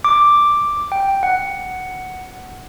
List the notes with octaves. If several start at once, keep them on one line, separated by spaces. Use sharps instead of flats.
D6
G5
F#5